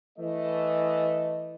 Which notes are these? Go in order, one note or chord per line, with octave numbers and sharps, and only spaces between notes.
E3 A3 D#5